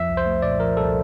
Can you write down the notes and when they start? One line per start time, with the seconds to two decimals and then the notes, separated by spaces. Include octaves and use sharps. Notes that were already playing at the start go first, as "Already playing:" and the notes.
Already playing: F2 F3 E5
0.09 C2
0.17 C5
0.26 A3
0.42 A#2 D5
0.59 F3 A#4
0.77 C2 A4